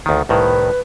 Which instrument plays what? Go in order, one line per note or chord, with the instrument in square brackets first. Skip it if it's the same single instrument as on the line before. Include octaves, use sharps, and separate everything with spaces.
[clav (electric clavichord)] D2 D#3
[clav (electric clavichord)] C2 A2 D#3 [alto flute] B4